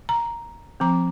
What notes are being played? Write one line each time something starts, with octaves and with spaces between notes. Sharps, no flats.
A#5
F3 C4 A#5